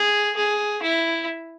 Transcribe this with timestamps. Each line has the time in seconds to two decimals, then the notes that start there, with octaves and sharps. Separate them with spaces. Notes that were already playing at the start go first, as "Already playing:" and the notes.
Already playing: G#4
0.36 G#4
0.83 E4